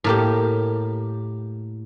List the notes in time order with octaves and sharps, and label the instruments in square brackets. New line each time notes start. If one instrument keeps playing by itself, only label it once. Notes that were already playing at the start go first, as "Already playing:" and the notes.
[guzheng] A2 A#3 G4